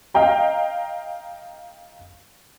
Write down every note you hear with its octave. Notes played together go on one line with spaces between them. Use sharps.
D#5 F5 G5 A#5